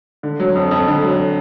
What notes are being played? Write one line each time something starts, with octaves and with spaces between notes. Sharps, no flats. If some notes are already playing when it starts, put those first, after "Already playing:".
D3
F#3
F2
F2
D3
F#3